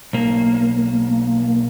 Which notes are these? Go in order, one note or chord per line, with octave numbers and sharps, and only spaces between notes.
B1 A#3